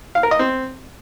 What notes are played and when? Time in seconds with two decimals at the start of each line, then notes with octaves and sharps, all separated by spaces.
0.15 F5
0.23 A#4
0.31 D#5
0.39 C4